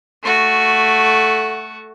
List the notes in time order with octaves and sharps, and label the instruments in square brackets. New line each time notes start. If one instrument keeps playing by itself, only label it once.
[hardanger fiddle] A3 F#4